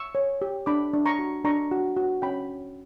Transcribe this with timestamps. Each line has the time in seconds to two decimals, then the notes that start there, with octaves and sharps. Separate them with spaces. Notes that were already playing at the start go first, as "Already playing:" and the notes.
Already playing: C#6 E6
0.15 C#5
0.42 G4
0.66 D4 B5 D6
0.93 D4
1.06 A#5 C#6
1.19 F#4
1.45 D4 A#5 C#6
1.71 F#4
1.97 F#4
2.22 C#4 G5 B5